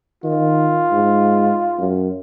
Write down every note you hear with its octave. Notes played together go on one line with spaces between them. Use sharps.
D#3 F4
G#2
F#2